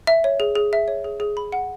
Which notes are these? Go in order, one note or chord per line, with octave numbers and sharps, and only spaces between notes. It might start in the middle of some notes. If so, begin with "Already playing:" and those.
E5
C#5
G#4
G#4
E5
C#5
G#4
G#4
B5
F#5